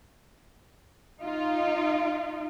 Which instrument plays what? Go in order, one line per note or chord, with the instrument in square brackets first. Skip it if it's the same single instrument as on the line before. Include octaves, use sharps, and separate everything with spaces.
[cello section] D#4 F4